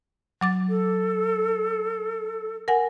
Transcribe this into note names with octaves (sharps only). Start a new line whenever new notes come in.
F#3 D6 A6
A4
A#4 F#5 G#5